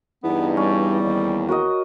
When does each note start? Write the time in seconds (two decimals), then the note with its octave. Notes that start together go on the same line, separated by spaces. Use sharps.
0.24 E2 G2 B3 D#4
0.57 G3 C#4
1.01 D#2
1.48 F#4 A#4 D#5